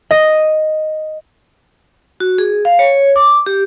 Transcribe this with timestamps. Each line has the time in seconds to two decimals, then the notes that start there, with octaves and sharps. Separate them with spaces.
0.11 D#5
2.20 F#4
2.38 G#4
2.65 F5
2.79 C#5
3.16 D6
3.46 G4